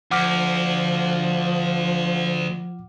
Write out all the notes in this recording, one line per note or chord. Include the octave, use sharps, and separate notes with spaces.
D2 F3 F#5 D6 F6